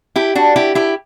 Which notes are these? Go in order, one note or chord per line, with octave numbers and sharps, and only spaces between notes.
E4 G4
D4 F#4
E4 G4
E4 G4